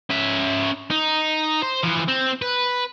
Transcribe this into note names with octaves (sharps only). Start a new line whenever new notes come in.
C#4 E5
D#4
C5
E3 F3
C4
B4